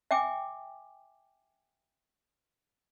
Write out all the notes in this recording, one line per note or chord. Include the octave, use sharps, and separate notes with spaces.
E5 G5 G#5 D6